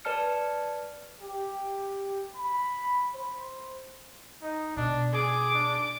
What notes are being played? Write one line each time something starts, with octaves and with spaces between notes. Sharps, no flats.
B4 D5 A5 F6 C#7
G4
B5
C5
D#4
B2 D4
G#4 D6
D4